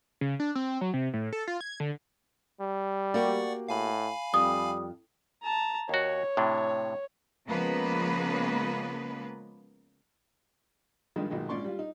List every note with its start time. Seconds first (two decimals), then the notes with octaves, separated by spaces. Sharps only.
0.21 C#3
0.40 D4
0.55 C4
0.81 F#3
0.94 C3
1.14 A2
1.33 A4
1.47 F4
1.61 G#6
1.80 D3
2.60 G3
3.14 A#3 F#4 G4 D5 F#5 C#6
3.69 A2 F5 G#5 B5
4.34 F2 G3 D#6
5.43 A5 A#5
5.89 D#2 F#4 C#5
6.37 A2 C3 D4
7.48 C#3 F3 G#3 A#3 B3 B4
11.16 G2 D#3 F3 G#3 D4
11.30 B1 A#2 D#3 G#3
11.49 A#1 G#2 C#4 D5 C6 C#6
11.65 G3 F4
11.79 D#4